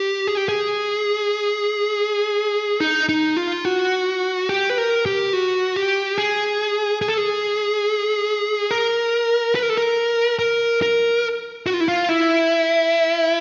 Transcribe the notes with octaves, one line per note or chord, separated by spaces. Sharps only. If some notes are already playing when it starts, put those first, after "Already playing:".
Already playing: G4
G#4
G4
G#4
D#4
D#4
F4
F#4
G4
B4
A#4
G4
F#4
G4
G#4
G#4
A4
G#4
A#4
B4
A#4
A4
A#4
A#4
A#4
F#4
F4
E4
F4
E4